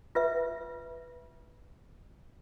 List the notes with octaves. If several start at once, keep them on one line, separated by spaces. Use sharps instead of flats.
F4 B4 E5